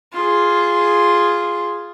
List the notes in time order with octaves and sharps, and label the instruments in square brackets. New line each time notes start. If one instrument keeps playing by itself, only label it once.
[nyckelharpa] F4 G#4